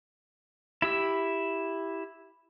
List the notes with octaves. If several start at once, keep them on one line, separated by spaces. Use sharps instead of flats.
E4 G4 E6